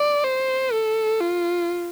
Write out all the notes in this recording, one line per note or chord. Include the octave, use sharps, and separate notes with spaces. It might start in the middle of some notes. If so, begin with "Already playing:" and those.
Already playing: D5
C5
A4
F4